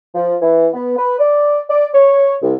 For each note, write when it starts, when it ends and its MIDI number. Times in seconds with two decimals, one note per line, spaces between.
0.15 0.35 53
0.41 0.68 52
0.74 0.96 59
0.97 1.14 71
1.18 1.60 74
1.69 1.85 74
1.94 2.34 73
2.42 2.54 36